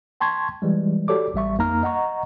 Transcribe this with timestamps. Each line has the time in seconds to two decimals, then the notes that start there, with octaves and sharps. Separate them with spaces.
0.21 G5 A5 C6 C#6 G#6
0.62 E3 G3 G#3
1.08 F#4 G4 A4 C#5 D5 D6
1.34 A1 G3 E5 C#6
1.58 F2 A#3 D#4 A#5 F6
1.83 D#5 F#5 A#5 C#6